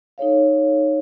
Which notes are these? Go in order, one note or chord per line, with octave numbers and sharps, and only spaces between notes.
D#4 A4 C#5 F5